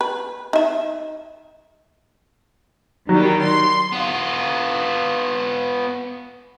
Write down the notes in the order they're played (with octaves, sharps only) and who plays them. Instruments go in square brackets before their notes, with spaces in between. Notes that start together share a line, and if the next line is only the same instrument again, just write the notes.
[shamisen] B4
D#4 E5
[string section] D#3 G3 [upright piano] F#3
[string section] C6
[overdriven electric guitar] B3 F4